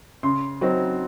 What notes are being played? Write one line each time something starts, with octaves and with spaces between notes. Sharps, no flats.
C#3 C6
F#3 C4 D#4